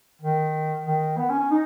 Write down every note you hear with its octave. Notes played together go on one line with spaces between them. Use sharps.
D#3
D#3
B3
C#4
C#4
D#4